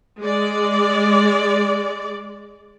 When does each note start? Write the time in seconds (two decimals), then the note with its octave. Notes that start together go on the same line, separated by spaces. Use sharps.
0.20 G#3 D5